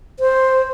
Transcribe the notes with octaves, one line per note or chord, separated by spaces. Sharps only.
C5